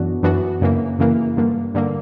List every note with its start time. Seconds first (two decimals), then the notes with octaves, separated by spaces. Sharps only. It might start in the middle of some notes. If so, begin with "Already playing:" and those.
Already playing: F#2 E3 B3 D4 F#4
0.23 F#2 E3 B3 D4 F#4
0.61 F#2 C#3 E3 A#3
0.98 F#2 C#3 E3 A#3
1.37 G2 D3 A#3
1.74 G2 D3 A#3